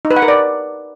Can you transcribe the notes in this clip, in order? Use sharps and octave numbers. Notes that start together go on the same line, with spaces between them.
D#4
B4
F#5
A#4
D5